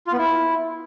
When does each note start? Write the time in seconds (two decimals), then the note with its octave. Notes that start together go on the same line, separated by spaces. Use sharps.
0.07 F4
0.13 B3
0.18 E4